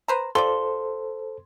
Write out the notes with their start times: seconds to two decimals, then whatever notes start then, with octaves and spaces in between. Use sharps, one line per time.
0.08 B4 C5 A#5
0.35 F4 G4 A4 C5 D5 C6